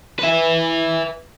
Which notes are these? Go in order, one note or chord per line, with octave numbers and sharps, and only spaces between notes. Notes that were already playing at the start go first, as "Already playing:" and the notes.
B4 E5